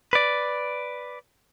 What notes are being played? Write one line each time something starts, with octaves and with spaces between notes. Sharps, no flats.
B4 D5